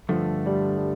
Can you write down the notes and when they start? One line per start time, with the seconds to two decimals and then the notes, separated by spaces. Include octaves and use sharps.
0.09 G2 D3 F3 A3
0.46 G3
0.77 G3